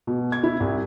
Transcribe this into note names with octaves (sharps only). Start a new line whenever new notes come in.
B2
G#6
E4
C2